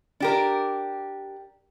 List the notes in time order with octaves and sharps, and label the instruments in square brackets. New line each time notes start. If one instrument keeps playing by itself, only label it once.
[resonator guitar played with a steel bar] D4 G4 A#4